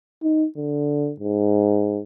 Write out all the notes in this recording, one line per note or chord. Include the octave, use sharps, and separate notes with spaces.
D#4
D3
G#2